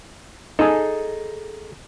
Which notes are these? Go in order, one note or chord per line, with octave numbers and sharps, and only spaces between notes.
D#4 G#4 A4